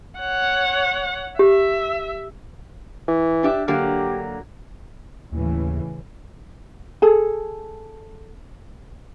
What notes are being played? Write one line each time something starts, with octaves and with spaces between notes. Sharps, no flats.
C#5 F#5
G4 E5
E3
D4 G4 E5
D3 F#3 A#3 G4
D#2 A2 C#3 E3
G#4 A4